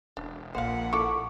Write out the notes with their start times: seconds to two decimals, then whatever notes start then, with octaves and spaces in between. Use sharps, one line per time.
0.17 E1 D4
0.55 A#1 A#2 C5 F5 F#5
0.93 E4 A4 C#6 D6